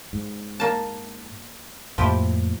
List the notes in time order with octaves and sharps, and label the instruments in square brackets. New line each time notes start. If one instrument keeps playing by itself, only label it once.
[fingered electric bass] G#2
[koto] A#3 A5
[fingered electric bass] F2 A2 A#3 [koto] F3 E4 G4